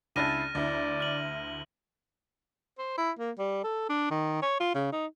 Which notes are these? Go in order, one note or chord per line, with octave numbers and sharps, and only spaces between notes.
C#2 D4 E4 F6 A6 A#6 D#7
D2 E4 D5
F6 F#7
C5
E4
A#3
G3
A4
D4
D#3
C#5
F4
C#3
D#4